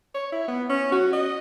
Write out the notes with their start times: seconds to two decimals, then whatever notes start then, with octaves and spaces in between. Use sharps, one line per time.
0.15 C#5
0.32 E4
0.48 B3
0.70 C#4
0.92 F#4
1.13 D#5